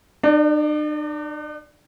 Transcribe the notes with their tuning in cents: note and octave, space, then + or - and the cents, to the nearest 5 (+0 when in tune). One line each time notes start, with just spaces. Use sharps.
D4 +45 D5 +0